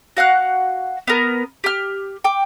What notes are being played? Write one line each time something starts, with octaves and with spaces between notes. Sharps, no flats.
F#4 F5 F#5 F#6
B3 A#4
G4 F6
G5 D6